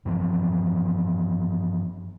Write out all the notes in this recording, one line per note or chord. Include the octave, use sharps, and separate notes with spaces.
G2 E3 F3 C4